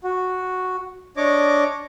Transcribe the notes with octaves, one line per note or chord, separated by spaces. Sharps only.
F#4
D4 C#5 D#5 D6